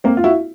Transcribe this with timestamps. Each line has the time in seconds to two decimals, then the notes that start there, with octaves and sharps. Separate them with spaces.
0.04 A#3 C4
0.17 F4
0.24 E4 F#4